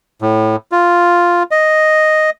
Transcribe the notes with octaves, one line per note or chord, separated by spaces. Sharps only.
A2
F4
D#5